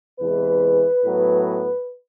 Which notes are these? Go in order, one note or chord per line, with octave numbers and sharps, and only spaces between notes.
E2 C3 E3 G#3 B4
A2 F#3 B3